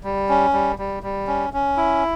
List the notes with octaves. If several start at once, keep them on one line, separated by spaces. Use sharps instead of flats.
G3
C#4
G3
G3
G3
C#4
C#4
E4